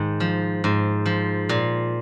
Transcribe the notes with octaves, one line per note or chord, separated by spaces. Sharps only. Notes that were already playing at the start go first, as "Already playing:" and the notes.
Already playing: G#2 D#3
F3
G#2
F3
A#2